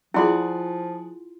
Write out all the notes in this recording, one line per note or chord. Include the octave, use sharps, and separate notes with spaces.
F3 E4 F4 G#4 D5 F#5 C6